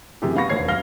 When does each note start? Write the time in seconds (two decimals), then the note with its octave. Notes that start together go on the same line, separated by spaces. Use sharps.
0.22 F#2 C3 E3 G4 G#4
0.36 B3 F5 B5 C#6 A#6
0.49 E1 D#2 C5 C#5 G#6 C7
0.68 F#2 F5 F6 A#6 G7